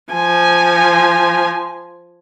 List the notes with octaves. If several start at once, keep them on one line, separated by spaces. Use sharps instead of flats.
F3 G#5